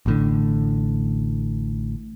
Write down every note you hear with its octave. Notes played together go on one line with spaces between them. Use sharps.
A1 A2 D3